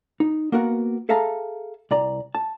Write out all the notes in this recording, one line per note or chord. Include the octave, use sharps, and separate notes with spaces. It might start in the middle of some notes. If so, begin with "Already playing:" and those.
D#4
A#3 B3 F#4 A#4 F#5
G#4 A4 E5 F5 A5 A#5
C2 D5 A#5
A5